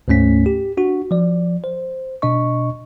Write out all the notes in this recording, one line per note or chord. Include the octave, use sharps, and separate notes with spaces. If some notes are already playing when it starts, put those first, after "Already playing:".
D2 G#2 A3 C#4 B6
G4
D4 F#4
F3 D5
C5
B2 D4 D#5 C#6